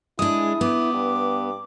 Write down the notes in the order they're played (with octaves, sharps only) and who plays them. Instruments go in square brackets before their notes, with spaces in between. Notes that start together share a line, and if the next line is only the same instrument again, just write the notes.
[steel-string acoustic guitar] G#3 D4 [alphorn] E4 [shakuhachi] G#4 [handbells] D#6
[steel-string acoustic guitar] B3 [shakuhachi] D6
[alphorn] G2